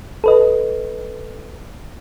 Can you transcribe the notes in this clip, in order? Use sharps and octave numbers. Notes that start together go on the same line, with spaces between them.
A4 B4 D#5